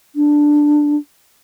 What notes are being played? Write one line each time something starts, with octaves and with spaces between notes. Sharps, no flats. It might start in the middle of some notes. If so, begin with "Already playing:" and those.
D4